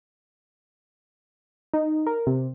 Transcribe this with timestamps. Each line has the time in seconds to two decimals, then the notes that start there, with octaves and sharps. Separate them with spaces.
1.74 D#4
2.07 A#4
2.27 C3